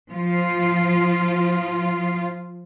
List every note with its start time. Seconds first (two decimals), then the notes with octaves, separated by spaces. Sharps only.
0.10 F3 F4